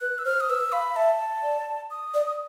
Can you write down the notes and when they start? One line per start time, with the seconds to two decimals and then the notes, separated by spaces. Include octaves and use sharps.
0.01 B4 F#6
0.18 E6
0.25 C5 F6
0.40 D#6
0.49 B4 E6
0.72 F5 B5
0.96 E5 A5
1.43 D5
1.90 D#6
2.14 D5